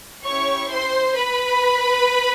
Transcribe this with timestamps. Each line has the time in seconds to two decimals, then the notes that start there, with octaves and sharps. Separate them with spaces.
0.25 C#4 E4 G4 C#5 C#6
0.70 C5 C6
1.15 B4 B5